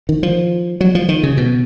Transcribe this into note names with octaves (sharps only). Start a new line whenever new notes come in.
D#3
F3
F#3
F3
D#3
C#3
B2